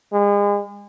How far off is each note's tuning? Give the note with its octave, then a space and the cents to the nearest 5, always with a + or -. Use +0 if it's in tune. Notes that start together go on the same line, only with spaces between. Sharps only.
G#3 -35